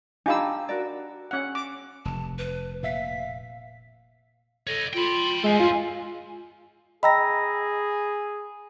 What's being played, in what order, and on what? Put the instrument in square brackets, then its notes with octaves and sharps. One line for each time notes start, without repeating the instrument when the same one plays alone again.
[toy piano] D4 B5 [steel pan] D#4 G4 E6 [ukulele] F4 F5 A5
[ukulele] F#4 A#4 D5
[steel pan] C#4 F#5
D6
[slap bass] F1 [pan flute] A5
[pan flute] B4
[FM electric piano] A#2 E5 B6 [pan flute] F5
[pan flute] A4 [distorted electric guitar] C#5 D#5
[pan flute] F4 [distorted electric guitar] G5 B5
[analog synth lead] G#3 [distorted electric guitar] A4 C5 [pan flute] G#5
[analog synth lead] F4
[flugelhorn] G#4 [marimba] D#5 G5 A#5 [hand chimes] B5 E6 A#6